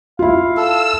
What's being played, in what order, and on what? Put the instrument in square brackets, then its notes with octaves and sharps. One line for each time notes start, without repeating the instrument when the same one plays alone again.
[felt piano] E4 F4 [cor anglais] F5
[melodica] A4 [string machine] E6